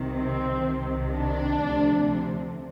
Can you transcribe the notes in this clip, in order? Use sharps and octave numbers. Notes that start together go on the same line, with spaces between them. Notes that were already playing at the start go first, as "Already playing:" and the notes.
Already playing: C2 C3 D#3
C4
C2 C3 D#3
D4
D2 C3 F3